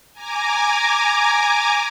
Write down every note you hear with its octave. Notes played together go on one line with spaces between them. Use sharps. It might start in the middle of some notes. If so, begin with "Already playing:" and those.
G#5 A#5 D6